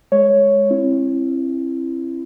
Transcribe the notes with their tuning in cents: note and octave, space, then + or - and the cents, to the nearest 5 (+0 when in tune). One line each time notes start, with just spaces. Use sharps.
G#3 +0 C#5 +0
C4 +40 E4 +20